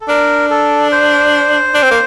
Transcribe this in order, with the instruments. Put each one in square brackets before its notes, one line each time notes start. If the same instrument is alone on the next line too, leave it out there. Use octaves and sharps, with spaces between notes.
[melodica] A4
[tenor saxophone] D4 [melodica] A#4
[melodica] A4
C5
[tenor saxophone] D4
C4
A#3